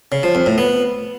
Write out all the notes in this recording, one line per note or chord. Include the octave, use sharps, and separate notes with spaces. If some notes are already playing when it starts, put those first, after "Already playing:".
C#3
F3
F2
A2
B3